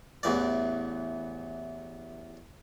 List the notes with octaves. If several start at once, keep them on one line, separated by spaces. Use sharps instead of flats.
A1 E2 E3 D5